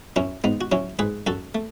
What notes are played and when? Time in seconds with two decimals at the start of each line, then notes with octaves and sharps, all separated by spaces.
0.16 F#2 C#4 E4
0.44 G#2 B3 D#4
0.61 F#4
0.72 F#3 C#4 E4
0.99 G#2 G#4 B4
1.27 F#2 F#4 A4
1.55 A3